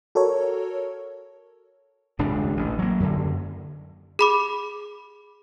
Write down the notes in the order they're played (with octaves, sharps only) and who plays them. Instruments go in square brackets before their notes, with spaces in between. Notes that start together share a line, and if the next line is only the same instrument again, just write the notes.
[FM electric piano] F#4 A4 A#4 C#5
[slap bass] D#1 C#2 G2 D4
A1
F#3 A#3
F#2 D3
[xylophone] G#4 B5 D6